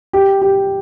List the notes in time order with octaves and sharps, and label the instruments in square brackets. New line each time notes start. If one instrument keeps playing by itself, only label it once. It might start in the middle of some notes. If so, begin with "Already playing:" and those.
[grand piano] G4
G4